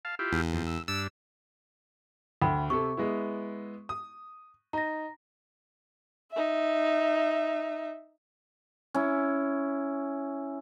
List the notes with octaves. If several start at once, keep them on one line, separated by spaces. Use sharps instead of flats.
F5 A5
E4 F4 G4
E2
F2
E6
G2 D4 E6
D2 G5 B5
C3 A4 C#6
G#3 B3 E4
D#6
D#4 A#5 A#6
D#4 E5
C#4 E4